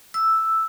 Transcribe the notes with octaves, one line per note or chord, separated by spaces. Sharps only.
E6